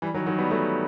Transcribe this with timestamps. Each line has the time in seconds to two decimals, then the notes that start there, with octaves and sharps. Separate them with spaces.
0.02 E3 G3
0.14 D#3 F#3
0.26 D#3 F#3
0.38 G3 B3
0.51 F#3 A3